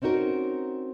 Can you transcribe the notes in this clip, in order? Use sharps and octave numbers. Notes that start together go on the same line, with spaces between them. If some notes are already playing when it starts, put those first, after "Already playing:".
C4 C#4 D#4 F#4 A#4